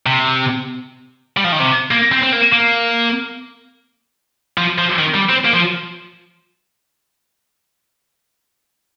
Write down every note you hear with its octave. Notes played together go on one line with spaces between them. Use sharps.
C3
G3
F3
D#3
C3
A#3
C4
C4
A#3
A#3
F3
F3
D#3
G3
C4
A#3
F3